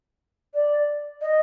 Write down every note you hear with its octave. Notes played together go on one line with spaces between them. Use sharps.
D5
D#5